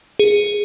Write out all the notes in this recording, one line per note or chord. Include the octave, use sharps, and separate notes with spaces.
G#4